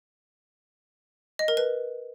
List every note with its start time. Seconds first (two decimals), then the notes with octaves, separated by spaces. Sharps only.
1.39 D#5
1.48 A#4
1.57 B4